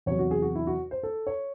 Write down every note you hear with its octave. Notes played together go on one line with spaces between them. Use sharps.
E2 C3 F#3 C#5
F#4
G#4
F#4
E4
F#4
C5
A4
C#5